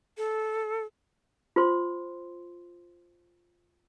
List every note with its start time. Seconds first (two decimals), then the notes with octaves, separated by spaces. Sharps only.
0.17 A4
1.56 F4 C5 C6